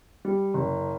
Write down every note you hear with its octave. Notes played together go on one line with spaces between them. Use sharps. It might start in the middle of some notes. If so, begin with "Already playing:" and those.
G3
F#1